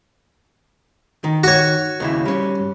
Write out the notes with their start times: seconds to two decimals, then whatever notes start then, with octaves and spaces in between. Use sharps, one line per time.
1.24 D#3
1.44 F#4 C#5
2.00 D#2 C#3 E4
2.25 G3 C#4